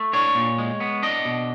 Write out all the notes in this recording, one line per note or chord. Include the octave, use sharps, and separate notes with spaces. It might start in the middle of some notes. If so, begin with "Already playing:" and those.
Already playing: A3
D4 C#5
A#2
G#3
B3
D4 D#5
B2